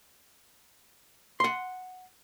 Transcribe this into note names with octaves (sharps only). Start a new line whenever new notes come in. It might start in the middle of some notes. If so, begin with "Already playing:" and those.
F#5 C6